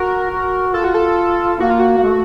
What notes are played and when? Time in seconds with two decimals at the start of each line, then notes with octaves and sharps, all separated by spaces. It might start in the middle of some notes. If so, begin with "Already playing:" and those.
Already playing: F#4 A#4
0.30 F#4
0.74 F4 A4
0.84 F#4
0.94 A4
1.60 A#3 F#4
1.70 F4
1.80 F#4
1.98 A#3
2.03 A3